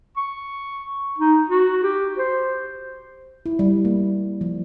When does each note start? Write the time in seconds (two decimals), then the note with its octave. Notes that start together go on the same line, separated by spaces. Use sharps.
0.17 C#6
1.19 D#4
1.49 F#4
1.83 G4
2.18 C5
3.46 E4
3.59 G3
3.85 A#3
4.41 F3